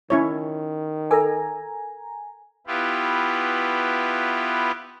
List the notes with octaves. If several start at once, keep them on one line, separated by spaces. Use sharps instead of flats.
D#3 C#4 E4 C#5
A4 A#4 G#5 A#5
B3 E4 F4 G4 B4